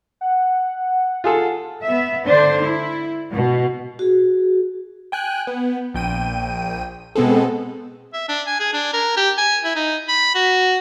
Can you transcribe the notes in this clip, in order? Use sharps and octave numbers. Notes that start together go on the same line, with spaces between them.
F#5
F4 G#4 A4
B3 E5
D3 D4 C5
E4
B2
F#4 G#4
G5 G#5 F#6
B3
A#1 G5 D#7
B2 G#3 B3 C4 G#4 A4
E5
D4
G#5
G#4
D4
A#4
G4
G#5
E4
D#4
B5
F#4